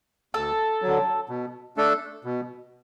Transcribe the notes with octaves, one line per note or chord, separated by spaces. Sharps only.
D2 A4
D3 F#3
B2
A3 D4 A4
B2